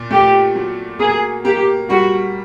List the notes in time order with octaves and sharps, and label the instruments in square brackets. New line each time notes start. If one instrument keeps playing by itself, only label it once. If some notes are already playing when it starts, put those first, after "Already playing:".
Already playing: [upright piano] A#2
[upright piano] A3 [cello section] G4
[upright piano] F#3
[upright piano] A#3 [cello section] G#4
[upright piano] A#3 [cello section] G4
[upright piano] G3 [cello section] F#4